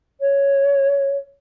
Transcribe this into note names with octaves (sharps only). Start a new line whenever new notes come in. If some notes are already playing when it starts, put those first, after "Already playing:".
C#5